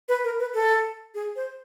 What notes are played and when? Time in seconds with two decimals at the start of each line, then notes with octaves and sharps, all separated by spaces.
0.08 B4
0.24 A#4
0.39 B4
0.54 A4
1.14 G#4
1.36 C5